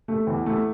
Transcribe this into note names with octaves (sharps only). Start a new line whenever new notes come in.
A3
E2
A3